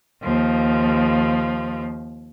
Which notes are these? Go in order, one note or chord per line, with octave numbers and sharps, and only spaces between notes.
D#2 F3